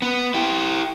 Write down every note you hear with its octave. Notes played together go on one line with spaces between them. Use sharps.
B3
E4 G4